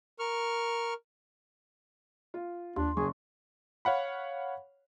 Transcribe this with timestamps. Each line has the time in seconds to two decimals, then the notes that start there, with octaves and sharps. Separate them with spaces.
0.19 A#4 C#6 F6
2.34 F4
2.76 D#2 D4 C6
2.97 F#1 G#4 C#6
3.85 C#5 F5 F#5 B5